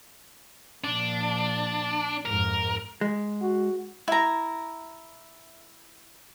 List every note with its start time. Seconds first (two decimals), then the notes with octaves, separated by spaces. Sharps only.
0.84 A#2 F3 D4
2.25 F2 G#2 A#4
3.01 G#3
3.42 F#4
4.08 E4 A#5